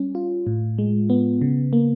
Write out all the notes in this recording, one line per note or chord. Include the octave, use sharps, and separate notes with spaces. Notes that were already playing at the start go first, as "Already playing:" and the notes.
Already playing: G3 C#4
F4
A2
G#3
B3
C#3
A#3